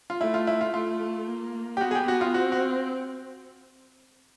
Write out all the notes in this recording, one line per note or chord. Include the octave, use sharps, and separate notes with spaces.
F4
A3 E4
F4
E4
F4
A3 F4
A#3
G4
B3 F#4
G#4
G4
F#4
F4
C4 F#4
F#4